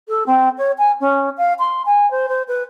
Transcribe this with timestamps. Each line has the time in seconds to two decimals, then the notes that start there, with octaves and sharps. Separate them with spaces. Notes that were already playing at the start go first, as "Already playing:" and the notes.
0.09 A4
0.27 C4
0.58 C#5
0.78 G#5
1.01 C#4
1.38 F5
1.59 C6
1.86 G#5
2.11 C5
2.29 C5
2.48 B4